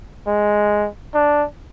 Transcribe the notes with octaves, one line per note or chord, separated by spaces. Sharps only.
G#3
D4